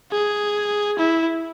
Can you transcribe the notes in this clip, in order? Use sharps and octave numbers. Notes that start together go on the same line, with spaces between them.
G#4
E4